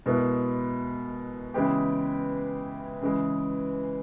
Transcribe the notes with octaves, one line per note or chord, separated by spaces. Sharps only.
B2 G#3 B3 E4 A#4
C#3 E3 G#3 B3 G4
C#3 E3 G#3